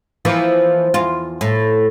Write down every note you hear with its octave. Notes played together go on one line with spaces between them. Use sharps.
E3 F3 A#3
E2 F4
A2